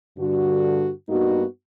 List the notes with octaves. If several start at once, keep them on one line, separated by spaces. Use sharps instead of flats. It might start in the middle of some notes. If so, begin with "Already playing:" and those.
G2 D3 F#4
G2 A#3 B3 D#4 F#4